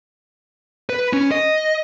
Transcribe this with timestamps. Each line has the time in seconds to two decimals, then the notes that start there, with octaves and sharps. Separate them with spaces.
0.90 B4
1.13 C#4
1.31 D#5